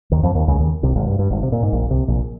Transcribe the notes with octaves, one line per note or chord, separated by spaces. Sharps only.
D#2 D#3
F2 F3
D#2 D#3
C#2 C#3
D#2 D#3
C2 C3
G#1 G#2
G2
G2
G#1 G#2
C3
A#2
G#2
A#1 A#2
C2 C3
A#1 A#2